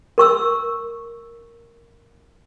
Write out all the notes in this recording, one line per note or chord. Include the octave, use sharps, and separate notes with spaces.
A#4 C#6 E6